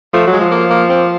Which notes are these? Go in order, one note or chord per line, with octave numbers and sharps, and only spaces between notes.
F3 A3
F#3
G#3
F3
A#3
A#3
C4